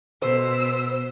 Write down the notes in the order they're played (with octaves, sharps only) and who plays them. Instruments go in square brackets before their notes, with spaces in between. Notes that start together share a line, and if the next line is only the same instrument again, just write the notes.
[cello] B2 [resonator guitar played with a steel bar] C5 [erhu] E6